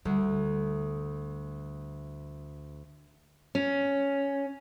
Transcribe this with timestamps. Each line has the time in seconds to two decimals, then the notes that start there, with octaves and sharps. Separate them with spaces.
0.05 D2 G3
3.55 C#4